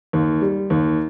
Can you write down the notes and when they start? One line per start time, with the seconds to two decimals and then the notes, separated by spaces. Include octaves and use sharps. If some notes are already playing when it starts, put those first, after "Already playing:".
0.13 D#2
0.42 G3
0.70 D#2